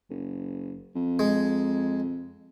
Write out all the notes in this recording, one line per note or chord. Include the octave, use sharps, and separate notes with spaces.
F#1
F2
G#3